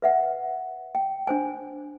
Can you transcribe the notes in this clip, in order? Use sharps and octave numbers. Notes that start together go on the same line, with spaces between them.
B4 E5 F#5
G5
D4 C5 G#5